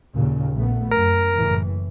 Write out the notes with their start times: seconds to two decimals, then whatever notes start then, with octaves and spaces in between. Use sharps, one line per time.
0.14 D#2 A#2 C#3
0.54 A#1 A3 B3
0.91 F#2 A#4
1.35 F#1 A2 E3